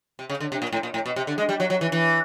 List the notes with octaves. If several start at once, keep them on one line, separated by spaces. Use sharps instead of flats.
C3
C#3
D3
C3
A#2
A2
A#2
A2
B2
C3
D3
G#3
G3
F#3
F#3
E3
E3